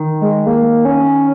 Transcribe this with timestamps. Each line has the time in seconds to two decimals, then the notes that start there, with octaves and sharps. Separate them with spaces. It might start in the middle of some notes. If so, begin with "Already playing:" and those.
Already playing: D#3
0.21 G#3
0.47 A#3
0.85 C#4